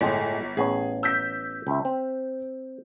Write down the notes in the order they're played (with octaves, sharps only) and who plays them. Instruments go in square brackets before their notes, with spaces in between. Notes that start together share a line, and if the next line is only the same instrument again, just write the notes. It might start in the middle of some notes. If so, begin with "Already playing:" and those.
[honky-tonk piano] G1 [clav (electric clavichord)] A2 G#3 G5
[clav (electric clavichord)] A1 B3 C#5 [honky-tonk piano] G#4
[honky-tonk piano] E6 G6 B6
[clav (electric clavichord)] C#2 E5
C4